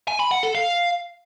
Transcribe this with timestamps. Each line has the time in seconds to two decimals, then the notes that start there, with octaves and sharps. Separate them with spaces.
0.08 G#5
0.19 B5
0.31 F#5
0.43 A4
0.55 F5